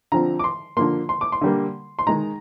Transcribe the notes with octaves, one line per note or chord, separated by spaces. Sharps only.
D3 F3 C4 A#5
D6
C6
D3 F3 A#3 C6
C6
D6
C6
D3 G3 A#3
C6
D#3 G#3 D#4 A#5